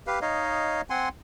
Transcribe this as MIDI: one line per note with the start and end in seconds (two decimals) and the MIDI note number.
0.07 0.19 67
0.07 0.19 71
0.07 0.19 77
0.22 0.81 63
0.22 0.81 73
0.22 0.81 75
0.22 0.81 77
0.90 1.09 60
0.90 1.09 78
0.90 1.09 80
0.90 1.09 84